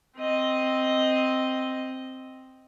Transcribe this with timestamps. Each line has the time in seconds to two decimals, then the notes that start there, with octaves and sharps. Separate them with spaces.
0.17 C4 D#5